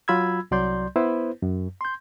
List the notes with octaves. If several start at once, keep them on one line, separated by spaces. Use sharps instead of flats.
F#3 F4 B5 E6 G#6
C2 F#3 D5 C6 G6
B3 E4 B4 C5
F#2
C6 G6